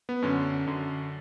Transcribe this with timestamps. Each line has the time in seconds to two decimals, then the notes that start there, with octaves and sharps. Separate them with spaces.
0.09 B3
0.22 F#2 D3 C#4
0.67 F#2 D3